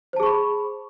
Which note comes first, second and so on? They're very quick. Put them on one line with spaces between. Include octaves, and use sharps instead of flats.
C5 A5 G#4 C#6 B5